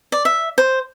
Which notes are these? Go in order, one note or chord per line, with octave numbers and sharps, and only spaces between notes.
D5
E5
C5